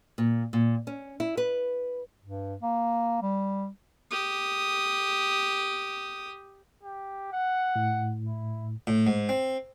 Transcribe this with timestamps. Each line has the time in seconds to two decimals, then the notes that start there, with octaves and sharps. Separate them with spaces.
0.18 A#2
0.53 A#2
0.87 C#4
1.20 E4
1.37 B4
2.25 G2
2.63 A#3
3.22 G3
4.11 G4 D#6
6.83 G4
7.32 F#5
7.76 A2
8.26 E4
8.87 A2
9.07 G#2
9.29 C4